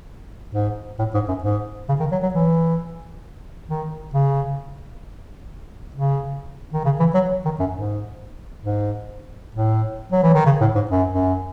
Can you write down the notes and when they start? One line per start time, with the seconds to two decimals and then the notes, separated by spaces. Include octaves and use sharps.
0.54 G#2
0.99 A2
1.14 G#2
1.28 F#2
1.43 G#2
1.89 C#3
2.00 D#3
2.12 F#3
2.22 F#3
2.34 E3
3.69 D#3
4.14 C#3
5.95 C#3
6.73 D#3
6.85 C#3
6.99 E3
7.14 F#3
7.45 D#3
7.60 F#2
7.74 G#2
8.65 G#2
9.55 A2
10.12 F#3
10.23 E3
10.34 D#3
10.46 C#3
10.61 A2
10.75 G#2
10.91 F#2
11.13 F#2